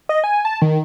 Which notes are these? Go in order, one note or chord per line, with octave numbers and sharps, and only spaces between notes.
D#5
G#5
A5
D#3